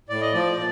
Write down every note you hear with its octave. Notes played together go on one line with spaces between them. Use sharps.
A2 D5
D#5
F3 D5
A#2